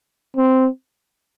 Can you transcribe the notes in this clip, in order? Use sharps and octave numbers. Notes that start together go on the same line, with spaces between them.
C4